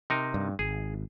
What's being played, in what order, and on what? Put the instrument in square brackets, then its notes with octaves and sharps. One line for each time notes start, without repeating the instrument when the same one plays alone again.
[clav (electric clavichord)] C3 D#4 A#4
[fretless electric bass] G2
[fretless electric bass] G#1 [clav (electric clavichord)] G#4